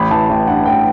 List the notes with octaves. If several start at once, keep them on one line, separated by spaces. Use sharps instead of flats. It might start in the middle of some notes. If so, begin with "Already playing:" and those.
Already playing: A1 B5
E3 A5
A1 G5
G2 F#5
A1 G5